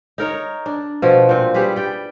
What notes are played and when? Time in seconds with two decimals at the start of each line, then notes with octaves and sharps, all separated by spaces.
0.18 D#4 A#4 C#5
0.66 D4
1.02 B2 F3 F#4
1.29 A#2 C4
1.54 G3 G4 G#4 B4
1.76 D5 G5